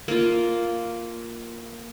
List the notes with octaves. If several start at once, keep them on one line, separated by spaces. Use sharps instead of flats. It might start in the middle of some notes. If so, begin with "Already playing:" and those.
A#3 F4